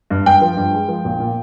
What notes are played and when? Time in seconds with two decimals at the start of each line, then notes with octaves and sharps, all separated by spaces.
0.11 G2
0.26 G2 G5
0.42 F3
0.57 G2
0.73 G#3
0.88 F3
1.05 A#1
1.20 A#2